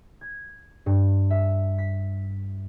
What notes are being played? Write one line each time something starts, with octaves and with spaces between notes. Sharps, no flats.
G#6
G2
E5
B6